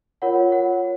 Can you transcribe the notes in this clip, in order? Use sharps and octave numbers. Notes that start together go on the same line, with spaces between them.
F4 A#4 C#5 F#5
F#5